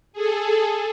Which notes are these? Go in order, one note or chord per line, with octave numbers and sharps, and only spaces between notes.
G#4 A4